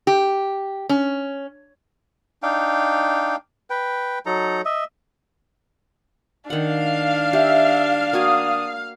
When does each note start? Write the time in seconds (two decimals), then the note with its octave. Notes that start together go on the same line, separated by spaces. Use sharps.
0.07 G4
0.89 C#4
2.43 D4 D#4 F5 G5
3.70 B4 G5
4.26 F#3 D#4 A4 A#5
4.65 D#5 E5
6.50 D#3 D4 F5 F#5
7.33 G4 E5
8.13 A#3 F#4 G#5 D#6